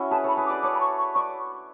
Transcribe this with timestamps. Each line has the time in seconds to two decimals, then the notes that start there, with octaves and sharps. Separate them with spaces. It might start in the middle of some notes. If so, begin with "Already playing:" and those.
Already playing: C#4 E4 F#4
0.11 G#4 B4 A5
0.24 A4 C#5 B5
0.37 G#4 B4
0.46 D6
0.50 B4 D5
0.63 A4 C#5 D6
0.75 B5
0.81 C#6
0.98 C#6
1.15 B4 D5 C#6